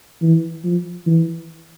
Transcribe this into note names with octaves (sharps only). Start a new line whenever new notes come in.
E3
F3
E3